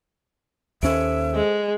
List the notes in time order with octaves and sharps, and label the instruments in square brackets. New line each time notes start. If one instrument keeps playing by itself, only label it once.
[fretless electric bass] D#2 C#4 [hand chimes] A4 C5 D7 [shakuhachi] E5
[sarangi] G#3